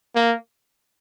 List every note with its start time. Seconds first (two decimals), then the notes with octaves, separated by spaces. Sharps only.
0.15 A#3